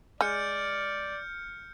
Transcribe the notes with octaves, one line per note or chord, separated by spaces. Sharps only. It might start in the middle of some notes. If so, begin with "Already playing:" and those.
G#3 D5 F6 G6 C#7